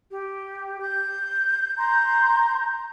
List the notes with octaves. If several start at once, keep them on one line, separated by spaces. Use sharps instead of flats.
G4
G6
A#5 C6 G6